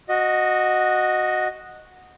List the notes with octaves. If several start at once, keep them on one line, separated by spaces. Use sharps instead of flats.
F#4 D#5